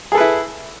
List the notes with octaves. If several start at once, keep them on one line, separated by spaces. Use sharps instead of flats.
E4 G#4 A4 B4